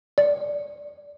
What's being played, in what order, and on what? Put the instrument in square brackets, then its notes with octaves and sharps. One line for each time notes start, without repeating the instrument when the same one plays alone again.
[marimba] D5